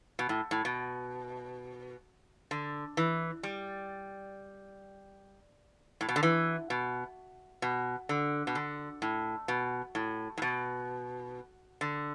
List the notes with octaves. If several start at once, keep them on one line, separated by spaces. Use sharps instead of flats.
B2
A2
A2
B2
D3
E3
G3
A2
B2
D3
E3
B2
B2
D3
B2
D3
A2
B2
A2
A2
B2
D3